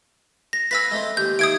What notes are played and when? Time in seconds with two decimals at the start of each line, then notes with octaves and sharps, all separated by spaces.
0.53 A#6
0.71 B4 F5 G#5 E6 A#6 B6
0.91 G#3 A3 C4
1.17 D#2 G6
1.39 D#2 E5 G#5 D#6 G#6 D7